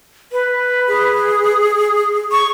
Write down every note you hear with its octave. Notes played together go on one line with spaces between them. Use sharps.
B4
G#4
C#6